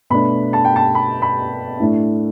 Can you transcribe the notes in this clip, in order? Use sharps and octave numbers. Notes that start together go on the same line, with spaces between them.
B2 A3 D4 B5
A5
G5
A5
B5
B5
A2 A3 D4